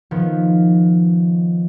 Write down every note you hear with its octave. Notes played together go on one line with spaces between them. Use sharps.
D#3 F3 B3